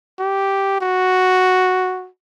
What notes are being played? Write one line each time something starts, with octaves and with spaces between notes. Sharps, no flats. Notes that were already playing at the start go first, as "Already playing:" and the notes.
G4
F#4